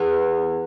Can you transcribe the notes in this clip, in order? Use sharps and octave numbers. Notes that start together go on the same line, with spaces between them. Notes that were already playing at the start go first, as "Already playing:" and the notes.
Already playing: E2 B3